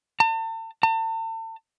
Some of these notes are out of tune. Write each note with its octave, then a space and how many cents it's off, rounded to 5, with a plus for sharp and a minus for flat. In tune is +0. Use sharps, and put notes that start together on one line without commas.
A5 +40
A5 +40